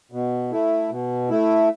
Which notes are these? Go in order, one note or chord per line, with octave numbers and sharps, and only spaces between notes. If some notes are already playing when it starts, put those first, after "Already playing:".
B2
A3 E4
B2
A3 E4